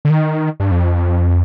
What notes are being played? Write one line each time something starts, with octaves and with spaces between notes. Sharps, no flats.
D3
D#3
G2
F2